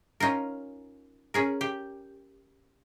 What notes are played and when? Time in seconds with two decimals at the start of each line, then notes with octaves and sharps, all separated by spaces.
0.20 C#4 D#4 F4 A#4
1.34 C#4 G#4 A#4
1.61 G4